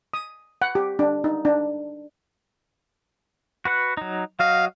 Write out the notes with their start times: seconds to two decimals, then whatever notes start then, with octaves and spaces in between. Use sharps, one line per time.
0.14 D#6
0.62 F#5
0.75 G4
0.99 D4
1.24 D#4
1.45 D4
3.65 F#4 B4 F#5
3.97 F#3 D#4
4.40 F#3 F#4 D#5 F5